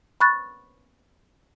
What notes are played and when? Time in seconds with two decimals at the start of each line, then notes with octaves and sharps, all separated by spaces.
0.20 B5 C#6 F#6 A6